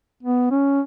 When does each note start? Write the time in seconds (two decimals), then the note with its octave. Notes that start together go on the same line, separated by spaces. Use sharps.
0.23 B3
0.51 C#4